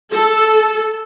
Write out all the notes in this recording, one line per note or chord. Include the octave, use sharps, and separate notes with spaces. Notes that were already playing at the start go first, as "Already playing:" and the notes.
A4